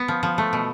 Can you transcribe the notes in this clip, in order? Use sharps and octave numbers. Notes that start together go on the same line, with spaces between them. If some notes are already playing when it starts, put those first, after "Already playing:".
Already playing: B3
F3
F3
A3
B2